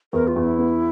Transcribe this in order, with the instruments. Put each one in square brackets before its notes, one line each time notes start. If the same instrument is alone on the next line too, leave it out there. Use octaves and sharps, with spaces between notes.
[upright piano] E2 [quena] A#4
[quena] F4
[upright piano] E2
[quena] E4
[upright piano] B3